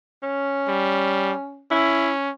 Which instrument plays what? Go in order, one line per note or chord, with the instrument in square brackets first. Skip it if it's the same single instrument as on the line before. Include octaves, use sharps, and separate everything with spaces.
[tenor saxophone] C#4
[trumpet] G3
[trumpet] C#4 [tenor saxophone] E4